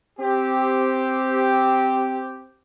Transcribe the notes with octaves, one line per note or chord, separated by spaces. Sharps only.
C4 G4